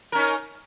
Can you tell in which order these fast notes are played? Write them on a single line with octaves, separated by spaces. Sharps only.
A#4 C#4 D#4